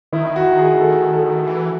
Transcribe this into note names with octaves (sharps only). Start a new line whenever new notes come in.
D#3 E4
F#4
G#4
A4
A4
E3